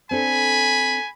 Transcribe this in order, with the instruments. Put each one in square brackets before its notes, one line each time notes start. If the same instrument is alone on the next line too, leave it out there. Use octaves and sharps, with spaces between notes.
[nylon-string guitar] C4 D4 A4 [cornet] G#5 [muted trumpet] B5